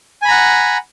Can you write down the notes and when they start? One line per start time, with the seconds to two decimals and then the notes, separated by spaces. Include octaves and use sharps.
0.22 G#5
0.25 B5
0.28 A#5
0.31 F#5